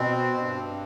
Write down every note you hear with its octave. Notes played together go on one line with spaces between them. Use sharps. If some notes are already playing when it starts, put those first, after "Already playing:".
Already playing: B2 C4
G2